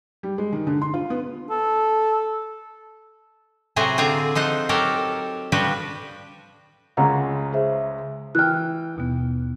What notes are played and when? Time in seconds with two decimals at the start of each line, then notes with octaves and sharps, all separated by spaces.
0.23 G3
0.38 G#3
0.53 D#3
0.67 D3
0.82 C6
0.94 F4
1.10 B3
1.50 A4
3.76 A2 C3 F#3 G#4 C5 A#5
3.98 D3 C4 F4 G#4 A#5
4.35 F3 D#4 C5 F#5
4.69 F#3 G4 A4 A#4
5.52 F3 G3 D4 F#4 G4 B4
6.97 C#2 C#3 G#3 F5 F#5 A#5
7.53 G#4 C5 E5
8.35 E3 G5 F6 F#6
8.96 D#2 B2 B3